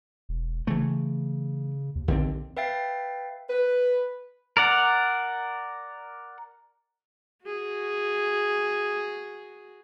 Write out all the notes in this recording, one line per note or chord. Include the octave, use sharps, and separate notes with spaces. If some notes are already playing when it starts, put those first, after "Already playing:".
E1
C#3 E3 A3
D#2
A#1 D#2 D3 C4
B4 E5 F5 G5 A6 C7
B4
A#4 D5 F#5
F#4 G#4